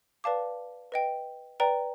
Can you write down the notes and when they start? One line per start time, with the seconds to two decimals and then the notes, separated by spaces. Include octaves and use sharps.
0.24 B4 D5 F5 A5 D6
0.92 B4 D#5 G5
1.60 B4 D5 G5 A#5